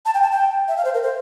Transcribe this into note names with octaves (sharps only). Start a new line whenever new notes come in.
A5
G5
A5
G5
E5
F5
C5
A#4
C5